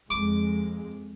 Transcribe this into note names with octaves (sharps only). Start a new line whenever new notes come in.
F2 G#3 D6